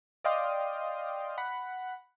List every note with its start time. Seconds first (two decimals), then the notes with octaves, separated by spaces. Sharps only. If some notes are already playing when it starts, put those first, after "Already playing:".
0.24 D5 D#5 F5 G5 C6 D#6
1.38 F#5 B5